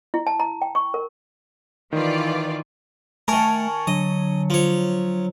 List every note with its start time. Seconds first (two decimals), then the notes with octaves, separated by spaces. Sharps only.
0.14 E4
0.27 A5
0.40 A#5
0.62 G5
0.75 C#6
0.94 A#4
1.93 D#3 E3 F4 D5
3.28 D#3 A3 A#4 G#5 A5 C#6
3.87 D3 F#3 D#5
4.50 F3 C#5